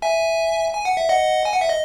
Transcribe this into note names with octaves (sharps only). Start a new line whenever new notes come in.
E5 G#5
G#5
F#5
E5
D#5 F#5
G#5
F#5
E5
D#5